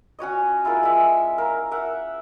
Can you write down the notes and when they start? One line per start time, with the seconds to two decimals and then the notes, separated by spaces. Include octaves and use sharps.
0.19 C#4 F#4 C#5 D#5
0.65 E4 F4 G#4 A#4
0.83 G#3 E5
1.38 A#4 F5
1.71 A#4 E5 F#5